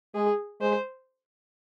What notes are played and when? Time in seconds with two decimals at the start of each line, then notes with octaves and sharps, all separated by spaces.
0.15 G#3 G#4
0.61 G#3 C5